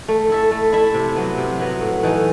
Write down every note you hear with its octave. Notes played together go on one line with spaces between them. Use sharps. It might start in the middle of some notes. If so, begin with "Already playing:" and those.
A3
E4 A4 E5
A3
E4 A4 E5
C3
F#3 B3
C3
F#3 B3
A2
E3 A3 D#4